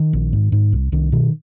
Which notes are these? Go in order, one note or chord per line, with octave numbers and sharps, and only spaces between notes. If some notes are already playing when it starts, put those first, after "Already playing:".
Already playing: D#3
A#1
G#2
G#2
C2
C2 D#3
B2 D#3